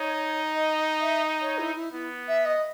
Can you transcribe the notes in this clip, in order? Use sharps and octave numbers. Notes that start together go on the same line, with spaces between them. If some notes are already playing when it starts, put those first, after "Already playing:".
Already playing: D#4 C#5
D#5
E5
C#5
E4
E4
B3 E4
E5
D#5